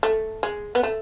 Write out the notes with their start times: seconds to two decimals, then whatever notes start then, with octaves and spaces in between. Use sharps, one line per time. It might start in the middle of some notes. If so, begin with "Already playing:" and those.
0.03 A3
0.43 G#3
0.75 B3
0.83 A3